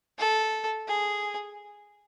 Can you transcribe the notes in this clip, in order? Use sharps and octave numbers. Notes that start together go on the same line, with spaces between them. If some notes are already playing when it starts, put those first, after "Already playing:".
A4
G#4